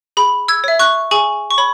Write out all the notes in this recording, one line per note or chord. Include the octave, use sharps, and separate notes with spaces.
G#4 B5
E6 G#6
C#5 E5
C#6 F#6
G#4 G#5 C#6
C#6
C#5 B5